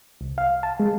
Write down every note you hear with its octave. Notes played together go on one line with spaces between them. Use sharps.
C2
F5
A5
G#3